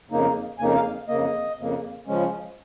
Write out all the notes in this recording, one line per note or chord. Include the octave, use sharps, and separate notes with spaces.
F2 C#3 A#3 D#4
F2 C#3 A#3 D#4 G#5
F5
F2 C#3 A#3 D#5
F2 C#3 A#3
C#3 F3 G#3 C#4